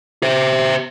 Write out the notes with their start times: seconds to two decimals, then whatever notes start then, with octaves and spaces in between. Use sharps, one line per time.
0.23 C5 E5